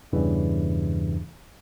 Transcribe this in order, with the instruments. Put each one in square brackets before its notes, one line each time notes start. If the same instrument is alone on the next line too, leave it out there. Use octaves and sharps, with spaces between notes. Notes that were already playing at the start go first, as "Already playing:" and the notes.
[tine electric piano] E2 G2 C#3 E3